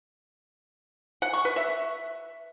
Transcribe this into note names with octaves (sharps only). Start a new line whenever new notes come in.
F#5
C#6
B4
E5